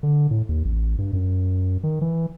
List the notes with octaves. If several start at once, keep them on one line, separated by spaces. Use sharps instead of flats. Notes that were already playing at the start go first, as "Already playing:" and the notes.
D3
A2
D#2
A1
G2
F#2
D#3
E3